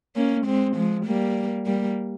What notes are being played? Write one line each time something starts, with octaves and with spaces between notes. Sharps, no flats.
A#3 C#4
G#3 C4
F3 G#3
G3 A#3
G3 A#3